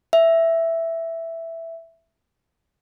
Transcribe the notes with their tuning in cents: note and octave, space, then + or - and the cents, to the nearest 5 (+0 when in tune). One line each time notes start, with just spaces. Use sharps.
E5 +5